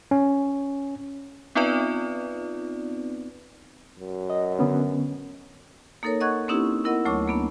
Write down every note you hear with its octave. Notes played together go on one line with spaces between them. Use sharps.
C#4
B3 C4 D#4 F4 B4 D5
F#2
D#5
D3 B3 C#4
A#3 D#4 A4 A#4 C#5
D#5 F#5 C#6 F#6 G#6
A#3 C4 C#4 D#4 E4 G4
B3 E4 A#4 D#5 F#5
D2 F#3 A3 C#5 C#6 D6
A#3 B3 D4